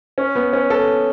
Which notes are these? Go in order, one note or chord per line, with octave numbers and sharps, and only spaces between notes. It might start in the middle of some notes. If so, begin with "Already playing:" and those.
C#4
B3
C#4
A4